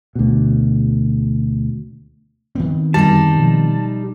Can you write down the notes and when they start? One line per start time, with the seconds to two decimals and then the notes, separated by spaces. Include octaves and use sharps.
0.15 D2 B2
2.55 D#3 B3 C4
2.94 E1 F#2 D3 G3 D#4 A5
3.34 B2 F3 F#3